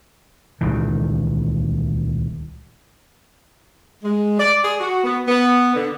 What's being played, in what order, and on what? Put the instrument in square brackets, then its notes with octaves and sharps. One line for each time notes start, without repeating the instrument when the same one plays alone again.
[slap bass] D#1 C#2 D#3 E3
[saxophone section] G#3
D5
G#4
F#4
B3
B3
D3